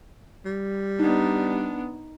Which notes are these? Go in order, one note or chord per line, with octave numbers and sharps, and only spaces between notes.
G3
B3 D4 D#4